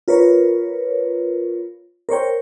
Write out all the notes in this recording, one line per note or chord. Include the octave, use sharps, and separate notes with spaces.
F4 A#4 B4 C#5
A#4 C5 C#5 G5